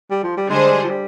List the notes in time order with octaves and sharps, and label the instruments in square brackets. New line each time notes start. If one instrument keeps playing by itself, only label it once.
[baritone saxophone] G3
F3
G3
[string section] D3 G3 D4 G#4 C5 [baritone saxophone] G#3
[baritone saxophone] F3
G3